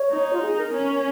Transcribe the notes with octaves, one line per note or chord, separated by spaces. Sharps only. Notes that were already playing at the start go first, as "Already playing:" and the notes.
Already playing: C#5
D#4
F4
G#4
A#4
C#4